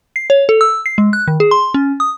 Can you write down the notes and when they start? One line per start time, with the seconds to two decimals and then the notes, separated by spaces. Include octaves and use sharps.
0.16 C7
0.30 C#5
0.49 A4
0.61 E6
0.86 C7
0.98 G#3
1.13 F#6
1.28 D#3
1.40 G#4
1.51 C6
1.74 C#4
2.00 D#6